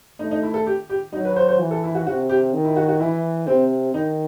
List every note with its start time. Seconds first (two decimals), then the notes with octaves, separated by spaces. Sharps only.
0.19 A3 D#4
0.31 D#4
0.43 E4
0.54 A4
0.66 G4
0.89 G4
1.12 F#3 D#4
1.25 B4
1.36 C5
1.49 C5
1.60 E3
1.71 A4
1.84 E4
1.95 F#4
2.07 C3 F#4
2.29 G4
2.54 D#3
2.65 E4
2.76 F#4
2.89 F#4
3.00 E3 E4
3.47 C3 C4
3.94 D#3 D#4